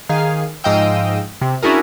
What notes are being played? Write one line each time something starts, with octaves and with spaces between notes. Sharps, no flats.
D#3 G#4 F5
G#2 F3 D#5 F5 G5 E6
C3
C#4 D4 E4 F#4 G#4 A#4